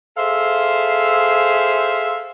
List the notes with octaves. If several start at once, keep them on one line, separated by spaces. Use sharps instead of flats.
G#4 A4 C5 E5 F5